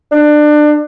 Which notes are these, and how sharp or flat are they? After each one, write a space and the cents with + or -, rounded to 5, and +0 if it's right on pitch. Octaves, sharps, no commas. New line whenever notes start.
D4 +25